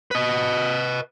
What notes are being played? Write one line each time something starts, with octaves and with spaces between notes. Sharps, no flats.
B4 D#5